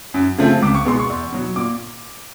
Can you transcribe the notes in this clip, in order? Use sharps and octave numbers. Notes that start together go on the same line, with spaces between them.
F#2
C#3 F3 A3 C4
C#2 D6
C#6
B2 G#3 B3 C6
C#6
E2
B2 F#3
A#2 D6